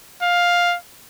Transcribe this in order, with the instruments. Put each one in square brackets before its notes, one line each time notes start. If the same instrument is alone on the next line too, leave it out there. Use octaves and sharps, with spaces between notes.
[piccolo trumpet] F5